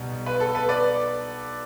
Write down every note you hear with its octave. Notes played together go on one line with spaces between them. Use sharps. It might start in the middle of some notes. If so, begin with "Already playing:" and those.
Already playing: B1 B2 G3
B4
A4
B4
B4 D5